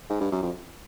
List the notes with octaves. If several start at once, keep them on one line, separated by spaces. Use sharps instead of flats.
G#2
G2
F#2
F2